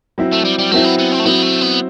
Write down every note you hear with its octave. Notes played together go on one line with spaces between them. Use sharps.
F#3 C4 E4
A3
G3
G3
F#3 A3 C4 E4
B3
B3
C4
A3
F#3 B3 C4 E4
A3
B3